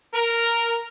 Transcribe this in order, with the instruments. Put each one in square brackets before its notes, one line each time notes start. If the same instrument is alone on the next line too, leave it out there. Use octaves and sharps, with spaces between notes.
[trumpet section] A#4